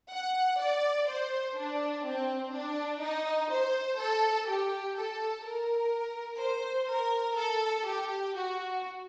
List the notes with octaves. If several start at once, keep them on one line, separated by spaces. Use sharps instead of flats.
F#5
D5
C5
D4
C4
D4
D#4
C5
A4
G4
A4
A#4
C5
A#4
A4
G4
F#4